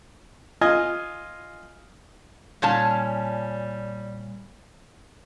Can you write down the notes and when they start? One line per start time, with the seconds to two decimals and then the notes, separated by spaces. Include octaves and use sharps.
0.61 F4 D#5 G#5
2.62 A#2 G3 C#4 A5